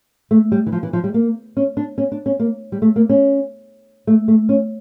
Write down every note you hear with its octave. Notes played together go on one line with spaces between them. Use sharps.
A3
G3
E3
F3
E3
F3
G3
A#3
C#4
D4
C#4
D4
C#4
A#3
G3
A3
A#3
C#4
A3
A3
C#4